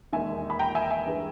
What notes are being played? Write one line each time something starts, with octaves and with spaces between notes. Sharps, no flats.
E1 D#2 D#3 E5 G#5
B5
G5 A#5
E5 G#5
E5 G#5
G2 E3 G#3